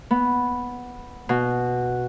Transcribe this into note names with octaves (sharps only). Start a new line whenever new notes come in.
B3
B2